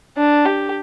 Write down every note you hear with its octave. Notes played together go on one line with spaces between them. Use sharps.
D4
G4